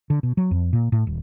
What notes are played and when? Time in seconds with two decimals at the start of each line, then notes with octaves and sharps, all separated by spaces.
0.10 D3
0.23 B2
0.37 F#3
0.51 F2
0.73 A#2
0.92 A2
1.07 D#1